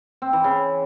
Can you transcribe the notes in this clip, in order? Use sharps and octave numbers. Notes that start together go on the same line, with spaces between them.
C4
E3
C#3